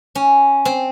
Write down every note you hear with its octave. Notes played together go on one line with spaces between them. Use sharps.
C#4
C4